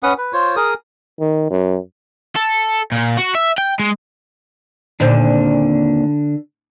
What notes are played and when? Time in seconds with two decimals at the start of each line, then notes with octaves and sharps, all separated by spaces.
0.03 C#4 B4 F#5 D#6
0.18 B4
0.33 F4 C5 C#5
0.56 G#4 A#4 D#6
1.20 D#3
1.50 F#2
2.36 A4
2.92 A#2
3.17 F#4
3.35 E5
3.58 G5
3.80 G#3
5.00 D#2 A#2 D3 C4 D4